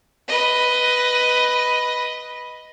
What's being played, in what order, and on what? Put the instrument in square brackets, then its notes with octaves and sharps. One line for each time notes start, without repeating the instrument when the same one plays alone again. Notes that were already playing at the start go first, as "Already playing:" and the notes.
[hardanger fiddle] B4 D#5